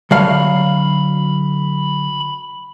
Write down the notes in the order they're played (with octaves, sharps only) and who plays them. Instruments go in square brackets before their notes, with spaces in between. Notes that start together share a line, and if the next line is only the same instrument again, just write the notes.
[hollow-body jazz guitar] D3 F#3 F5 [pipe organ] B5